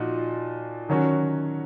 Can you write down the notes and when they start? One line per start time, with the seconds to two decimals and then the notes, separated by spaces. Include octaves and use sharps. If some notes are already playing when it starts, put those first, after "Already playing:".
Already playing: A#2 F3 D#4 F#4
0.89 D#3 F#3 C#4 F#4